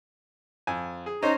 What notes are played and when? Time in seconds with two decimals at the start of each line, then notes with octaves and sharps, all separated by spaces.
0.67 F2 G#5
1.06 G#4
1.23 C#4 D#4 C5 A#5